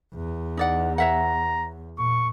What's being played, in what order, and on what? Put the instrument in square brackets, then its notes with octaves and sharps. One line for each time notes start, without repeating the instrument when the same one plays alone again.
[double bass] E2
[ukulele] D#4 D5 F#5
[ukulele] C#5 E5 F#5 [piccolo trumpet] A#5
[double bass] A#2 [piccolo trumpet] C#6